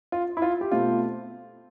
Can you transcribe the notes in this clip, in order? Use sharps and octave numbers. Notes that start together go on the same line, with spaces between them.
F4
E4
F4
G4
B2 A3 C4 F4